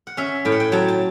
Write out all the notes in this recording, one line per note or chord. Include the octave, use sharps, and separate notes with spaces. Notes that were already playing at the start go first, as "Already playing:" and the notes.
F#5
C#4 E5
A2 G5
F#5
G5
F#3 A5
A5